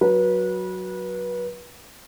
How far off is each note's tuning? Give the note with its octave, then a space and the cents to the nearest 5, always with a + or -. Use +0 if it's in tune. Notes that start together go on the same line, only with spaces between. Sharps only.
F#3 +0 B4 -25